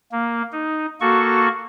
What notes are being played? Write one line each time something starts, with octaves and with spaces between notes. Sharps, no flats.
A#3
D#4
A#3 F#4 A4 C#6